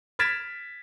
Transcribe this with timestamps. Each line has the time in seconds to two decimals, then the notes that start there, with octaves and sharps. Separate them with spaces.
0.19 F6 G#6 A6 B6 D7 E7